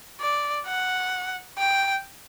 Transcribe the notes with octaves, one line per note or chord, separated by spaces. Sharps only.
D5
F#5
G5